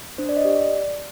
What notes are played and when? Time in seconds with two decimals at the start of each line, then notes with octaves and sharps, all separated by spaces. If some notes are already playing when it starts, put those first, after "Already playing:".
0.18 D4 C5
0.29 D5
0.37 D#5
0.45 G4
0.54 D5